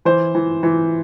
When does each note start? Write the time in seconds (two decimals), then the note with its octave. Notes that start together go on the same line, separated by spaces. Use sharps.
0.05 E3 C5
0.35 E3
0.63 E3